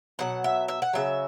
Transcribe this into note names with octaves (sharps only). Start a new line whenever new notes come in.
B2 F#3 F#5
E5
E5
F#5
C#3 F#3 E5